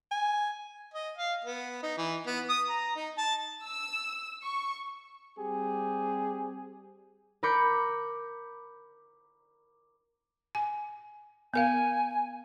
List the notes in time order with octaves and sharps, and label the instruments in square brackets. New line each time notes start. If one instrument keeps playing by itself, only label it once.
[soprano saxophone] G#5
[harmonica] D#5
F5
B3
D#4
E3
B3
D#6
A#5
D#4
A5
[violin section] E6
C#6
[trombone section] G3 C4 G4 G#4
[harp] A#4 B5 D6 G6 C#7
[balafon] G#5
[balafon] B3 A#4 F5 [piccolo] G#5